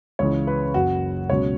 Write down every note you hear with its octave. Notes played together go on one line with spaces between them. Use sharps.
C#2 C#3 E3 C#5
B4
F#1 F#2 F#3 F#4
C#2 B2 F#3 C#5